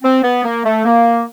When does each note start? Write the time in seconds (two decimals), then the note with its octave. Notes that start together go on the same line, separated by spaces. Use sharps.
0.02 C4
0.23 B3
0.44 A#3
0.64 A3
0.85 A#3